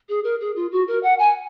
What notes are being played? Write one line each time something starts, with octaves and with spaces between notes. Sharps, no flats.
G#4
A#4
G#4
F4
F#4
A#4
F#5
G#5